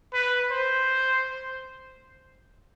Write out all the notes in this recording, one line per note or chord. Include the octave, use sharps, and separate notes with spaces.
B4
C5